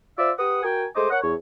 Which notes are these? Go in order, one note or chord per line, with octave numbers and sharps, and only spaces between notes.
F4 C5 D5 E5
G4 B4 F#5 D#6
F#4 A#4 G5 G#5
G#3 A3 C5 D#5 D6
A#4 C#5 F#5
E2 C#5